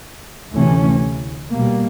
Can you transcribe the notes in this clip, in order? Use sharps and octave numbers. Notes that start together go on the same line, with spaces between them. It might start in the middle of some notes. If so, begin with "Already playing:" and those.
D2 C3 E3 A3 C#4
B2 G3 A#3